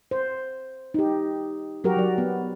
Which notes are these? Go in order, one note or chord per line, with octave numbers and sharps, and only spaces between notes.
C5
D#4 G4
F#3 F#4 G4 A#4
F#3 D5
B3